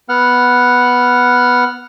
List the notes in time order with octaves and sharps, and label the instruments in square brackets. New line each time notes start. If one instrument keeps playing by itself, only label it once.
[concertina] B3 F#5 F6